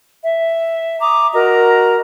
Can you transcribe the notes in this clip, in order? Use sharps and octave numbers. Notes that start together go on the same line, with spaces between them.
E5
A#5 D6 D#6
F#4 A#4 D#5 A#5